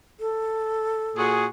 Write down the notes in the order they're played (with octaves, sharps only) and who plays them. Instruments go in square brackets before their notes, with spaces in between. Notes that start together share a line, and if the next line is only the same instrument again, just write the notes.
[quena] A4
[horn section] A#2 F#4 G#4